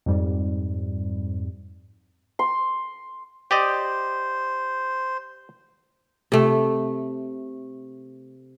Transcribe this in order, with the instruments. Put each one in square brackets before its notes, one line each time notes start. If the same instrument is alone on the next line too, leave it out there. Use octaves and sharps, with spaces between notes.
[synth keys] F2 G#2 G3
[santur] C6
[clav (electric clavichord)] G4 D5 D#5 [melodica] C5
[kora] C3 A3